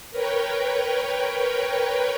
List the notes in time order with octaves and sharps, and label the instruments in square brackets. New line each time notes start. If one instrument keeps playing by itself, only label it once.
[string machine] A#4 B4 C#5 G5